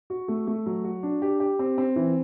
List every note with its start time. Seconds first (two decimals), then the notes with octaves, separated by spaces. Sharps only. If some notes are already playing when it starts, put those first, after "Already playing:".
0.10 F#4
0.28 A3
0.47 A3
0.66 F#3
0.84 F#4
1.03 D4
1.22 G4
1.40 G4
1.59 C4
1.78 C4
1.96 E3